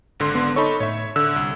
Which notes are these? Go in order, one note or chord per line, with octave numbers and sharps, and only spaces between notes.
G#1 D3 C6
B3
D#4 A4 C#5 B5 C#6
A2 C#5 E5
D3 E6
C2